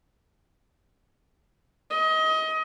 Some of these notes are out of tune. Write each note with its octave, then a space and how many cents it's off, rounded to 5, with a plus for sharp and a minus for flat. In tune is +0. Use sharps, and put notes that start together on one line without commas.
D#5 +25